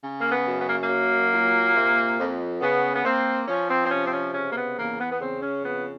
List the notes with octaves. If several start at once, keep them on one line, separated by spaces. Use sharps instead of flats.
C#3
A#3
B3
F#2
B3
A#3
A#3
F#3
A#2
C3
F2
C#3 B3
B3
A#3 C4
F3 C#4
C4
C4
C3 C#4
C4
C#4
C#3 C#4
A#3
B3
E2 A#3
B3
B3
C#3 C4
C#4
F2 B3